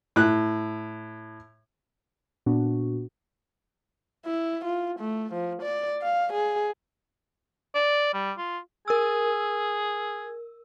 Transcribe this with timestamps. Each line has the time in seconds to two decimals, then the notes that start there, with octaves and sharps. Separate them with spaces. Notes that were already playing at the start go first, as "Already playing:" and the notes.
0.16 A2 F#6
2.46 A#2 B3 D4 F#4
4.25 E4
4.65 F4
4.99 A3
5.33 F3
5.62 D5
6.02 F5
6.33 G#4
7.75 D5
8.14 G3
8.38 F4
8.88 G#4 A#4 E6